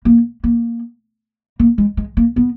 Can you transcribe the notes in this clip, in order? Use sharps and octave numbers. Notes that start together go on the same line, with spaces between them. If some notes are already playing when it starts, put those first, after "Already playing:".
A#3
A#3
A#3
G#3
G#3
A#3
B3